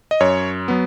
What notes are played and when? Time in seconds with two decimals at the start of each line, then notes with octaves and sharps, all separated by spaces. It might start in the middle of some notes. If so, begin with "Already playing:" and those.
0.11 D#5
0.20 F#2 C#5
0.68 F#3 B3